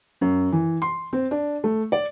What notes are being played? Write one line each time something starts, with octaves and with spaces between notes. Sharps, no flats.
F#2
E3
C6
C4
D4
A3
D5